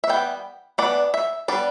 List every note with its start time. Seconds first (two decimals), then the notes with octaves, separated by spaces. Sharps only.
0.04 E5
0.09 E3 G3 B3 G5
0.78 E3 B3 D4 D5
1.14 E5
1.48 G3 B3 D4 D5